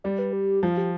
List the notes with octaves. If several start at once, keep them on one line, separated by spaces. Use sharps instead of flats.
G3 D5
B4
G4
F3 F4
G4